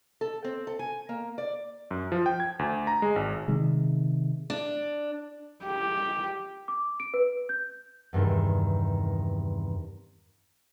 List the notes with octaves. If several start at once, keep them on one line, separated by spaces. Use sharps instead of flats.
A4
C4
A4
G#5
A#3
D5
F#2
F3
G5
G#6
D2
A#5
G#3
G#1
C3 D#3 G#3
D4
G4
D6
D7
B4
G6
E2 G2 C3 D#3